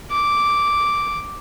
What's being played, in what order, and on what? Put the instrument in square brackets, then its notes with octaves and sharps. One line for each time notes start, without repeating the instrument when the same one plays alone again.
[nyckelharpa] D6